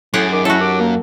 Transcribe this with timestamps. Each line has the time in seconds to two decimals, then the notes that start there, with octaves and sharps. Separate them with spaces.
0.14 F#2 A2 G4 G#4 F#5
0.32 D#3 D6
0.45 C#4 E4 F#4 A4
0.61 D#2 D6
0.80 A#3